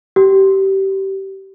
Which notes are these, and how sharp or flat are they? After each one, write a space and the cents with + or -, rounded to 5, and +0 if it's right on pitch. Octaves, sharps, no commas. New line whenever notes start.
G4 -20